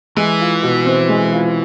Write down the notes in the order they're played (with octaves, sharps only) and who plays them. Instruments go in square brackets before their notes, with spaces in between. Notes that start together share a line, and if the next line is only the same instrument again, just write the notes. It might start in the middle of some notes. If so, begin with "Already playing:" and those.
[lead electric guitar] E3 [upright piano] G#3
[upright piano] F4
B2
C4
G#3
F4